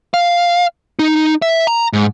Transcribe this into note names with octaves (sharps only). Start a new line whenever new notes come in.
F5
D#4
E5
A#5
G#2